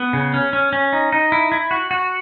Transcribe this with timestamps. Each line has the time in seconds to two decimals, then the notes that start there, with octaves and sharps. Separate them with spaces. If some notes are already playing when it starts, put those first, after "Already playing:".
Already playing: B3
0.13 C#3
0.34 C#4
0.53 C#4
0.73 C#4
0.93 D#4
1.12 D#4
1.32 E4
1.52 E4
1.71 F#4
1.91 F#4